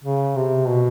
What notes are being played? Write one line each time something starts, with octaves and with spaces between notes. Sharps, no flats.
C#3
C3
B2